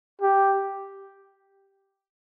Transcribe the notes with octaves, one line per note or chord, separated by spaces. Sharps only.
G4